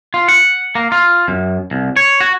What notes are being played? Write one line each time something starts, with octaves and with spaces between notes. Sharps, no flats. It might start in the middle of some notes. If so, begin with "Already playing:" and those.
F4
F#5
A#3
F4
F#2
C2
C#5
F#4